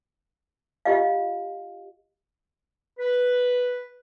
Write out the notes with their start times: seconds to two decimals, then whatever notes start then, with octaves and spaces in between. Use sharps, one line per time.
0.85 F4 G4 D#5 F5
2.99 B4